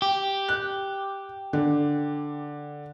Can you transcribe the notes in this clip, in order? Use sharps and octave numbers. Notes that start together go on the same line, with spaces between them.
G4
F#6
D3